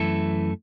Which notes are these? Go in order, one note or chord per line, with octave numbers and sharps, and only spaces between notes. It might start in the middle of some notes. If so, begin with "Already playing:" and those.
Already playing: F#2 E3 A3 E4 A4